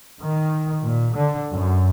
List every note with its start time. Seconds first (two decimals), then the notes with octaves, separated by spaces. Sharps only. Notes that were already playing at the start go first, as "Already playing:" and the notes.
0.21 D#3
0.83 A#2
1.16 D3
1.51 F#2